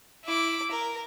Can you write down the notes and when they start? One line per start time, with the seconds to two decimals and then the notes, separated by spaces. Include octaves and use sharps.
0.25 E4 D6
0.71 A#4